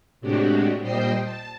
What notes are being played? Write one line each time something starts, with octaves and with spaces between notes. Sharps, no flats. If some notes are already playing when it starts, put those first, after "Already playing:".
A2 C3 G#3 D4 F#4 G4
A#2 G3 C5 D#5 G5 C6
A5